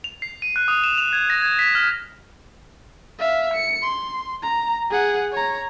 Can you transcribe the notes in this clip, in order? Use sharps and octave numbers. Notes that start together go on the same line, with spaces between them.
F7
C7
D#7
F#6
D#6
E7
F7
G#6
A#6
G#6
B6
F6
E5 F5
C#7
C6
A#5
G#4 F#5
C#5 A#5